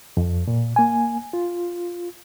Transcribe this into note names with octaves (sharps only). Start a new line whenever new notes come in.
F2
A#2
A#3 G#5
F4